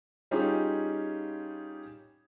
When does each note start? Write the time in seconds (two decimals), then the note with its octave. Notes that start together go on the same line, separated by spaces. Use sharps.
0.31 G3 C#4 D#4 F4 G4 G#4